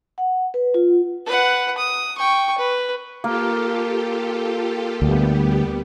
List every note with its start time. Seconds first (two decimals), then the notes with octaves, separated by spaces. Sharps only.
0.18 F#5
0.54 B4
0.74 F4
1.26 B4 F#5
1.78 D#6
2.18 G5 C#6
2.58 B4
3.24 A#3 F4 G4 A4
5.02 D2 G3 B3 G4